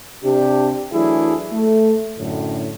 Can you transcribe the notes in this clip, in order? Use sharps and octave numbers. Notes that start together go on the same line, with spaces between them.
C3 D4 G4
E3 F#3 A3 D4 E4 G#4
A3
F#2 A2 D3